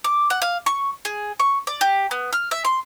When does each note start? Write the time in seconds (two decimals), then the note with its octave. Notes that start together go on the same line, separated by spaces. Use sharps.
0.04 D6
0.30 F#5
0.42 F5
0.66 C#6
1.05 G#4
1.40 C#6
1.67 D5
1.81 G4
2.11 B3
2.33 F6
2.51 E5
2.65 C6